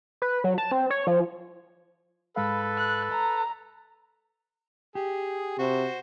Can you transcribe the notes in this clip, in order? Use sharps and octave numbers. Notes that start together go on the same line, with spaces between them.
B4
F#3
A5
C4
C#5
F3
G#2 G#3 A4 B4 F5 B5
F#6
A#5
G4 G#4
C3 F#4 C5